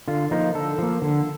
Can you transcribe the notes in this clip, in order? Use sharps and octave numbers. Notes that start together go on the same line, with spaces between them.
D3 F4
F3 A#3 D#4
D3 A4
F3 A#3
D3